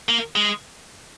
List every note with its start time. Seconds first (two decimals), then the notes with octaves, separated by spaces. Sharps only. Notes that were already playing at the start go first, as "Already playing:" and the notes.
0.09 A#3
0.36 G#3